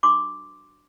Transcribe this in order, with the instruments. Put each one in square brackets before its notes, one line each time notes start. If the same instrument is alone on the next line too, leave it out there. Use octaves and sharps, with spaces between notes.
[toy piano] D4 F#4 B4 C6 D6